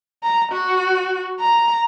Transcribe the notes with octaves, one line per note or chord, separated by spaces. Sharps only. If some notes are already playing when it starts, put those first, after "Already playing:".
A#5
F#4
A#5